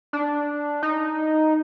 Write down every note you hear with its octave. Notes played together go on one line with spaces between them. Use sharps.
D4
D#4